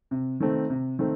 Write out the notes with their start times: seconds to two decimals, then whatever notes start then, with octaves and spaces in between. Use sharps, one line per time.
0.11 C3
0.40 D#3 A3 C4
0.70 C3
0.99 D#3 A3 C4